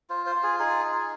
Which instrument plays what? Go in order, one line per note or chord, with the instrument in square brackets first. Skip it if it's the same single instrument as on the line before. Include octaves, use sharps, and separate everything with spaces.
[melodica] F4 C5
C5
F4
G#4
D#4 G#4
D#4